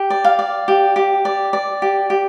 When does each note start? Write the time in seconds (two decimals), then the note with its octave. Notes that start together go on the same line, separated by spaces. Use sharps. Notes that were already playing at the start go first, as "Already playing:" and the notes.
Already playing: G4
0.10 D5
0.24 F5
0.39 D5
0.68 G4
0.96 G4
1.25 D5
1.53 D5
1.82 G4
2.10 G4